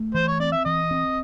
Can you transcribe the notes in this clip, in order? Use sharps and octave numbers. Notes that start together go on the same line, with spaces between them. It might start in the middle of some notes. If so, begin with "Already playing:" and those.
Already playing: A3
E3 C5
C#5
C4 D5
E5
E3 D#5
C4